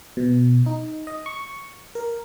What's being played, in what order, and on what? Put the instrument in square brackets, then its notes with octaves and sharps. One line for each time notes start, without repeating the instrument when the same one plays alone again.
[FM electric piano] B2
D#4
D#5
C#6
A#4